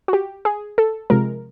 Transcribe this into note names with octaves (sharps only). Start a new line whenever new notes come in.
F#4
G4
G#4
A4
C3 F3 G#3 A#4